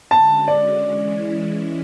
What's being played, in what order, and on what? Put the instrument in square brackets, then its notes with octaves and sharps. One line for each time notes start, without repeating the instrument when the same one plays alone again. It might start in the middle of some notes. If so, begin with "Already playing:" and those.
[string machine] D3 G#3 C#4 F#4 [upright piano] A5
[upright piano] D5
[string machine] E3 G#3 C#4 E4